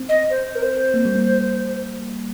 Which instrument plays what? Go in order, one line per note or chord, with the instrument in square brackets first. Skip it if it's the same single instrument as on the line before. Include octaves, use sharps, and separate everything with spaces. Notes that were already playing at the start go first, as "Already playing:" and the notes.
Already playing: [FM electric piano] C4
[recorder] D#5
C5
A#4
C5
[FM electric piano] A#3
G3
A#3